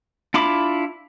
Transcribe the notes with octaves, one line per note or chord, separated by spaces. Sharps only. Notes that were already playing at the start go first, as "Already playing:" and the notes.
D4 E4 F4 B5 D6